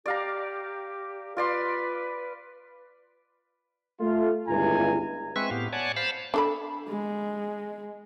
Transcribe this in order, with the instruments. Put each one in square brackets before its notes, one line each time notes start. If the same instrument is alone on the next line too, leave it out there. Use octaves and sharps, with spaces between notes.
[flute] G4 [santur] D5 F5 A#5
[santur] F4 D5 C6 [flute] B4
[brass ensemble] A3 F4
G1 C#2 G2 E4 G#5 A#5
[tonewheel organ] G#3 C4 B4 E5 C#6
A2 B3 G4 F5
C#5 D5 F#5 G#5 A5
C5 F5 A5 B5
[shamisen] D4 A4 B5
[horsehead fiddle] G#3